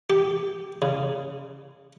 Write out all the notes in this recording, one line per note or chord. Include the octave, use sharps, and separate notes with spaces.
G4
C#3